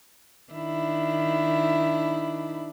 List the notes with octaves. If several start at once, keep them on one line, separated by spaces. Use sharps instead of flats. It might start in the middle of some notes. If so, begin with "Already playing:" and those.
D#3 D4 E4